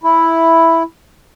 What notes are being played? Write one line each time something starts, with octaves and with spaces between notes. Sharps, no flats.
E4